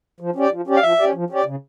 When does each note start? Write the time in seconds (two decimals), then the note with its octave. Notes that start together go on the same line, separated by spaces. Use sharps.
0.20 F3
0.36 C#4 G4 D5
0.51 F3
0.67 C#4 G4 D5
0.77 F5
0.83 F3 E5
0.99 C#4 G4 D5
1.14 F3
1.30 C#4 G4 D5
1.46 C#3